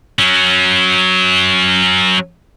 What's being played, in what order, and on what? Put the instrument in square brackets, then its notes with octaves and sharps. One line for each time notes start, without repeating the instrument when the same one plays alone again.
[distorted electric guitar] F#3 C#4